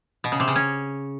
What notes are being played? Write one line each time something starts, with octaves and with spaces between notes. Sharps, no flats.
B2
C#3
C3
C#3
C#4